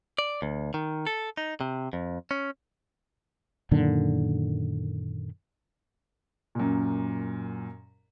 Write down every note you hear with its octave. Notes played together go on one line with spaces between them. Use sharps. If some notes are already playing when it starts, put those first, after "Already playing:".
D5
D2
D#3
A4
D#4
C3
F2
C#4
F#2 A#2 D3 D#3
F#2 A#2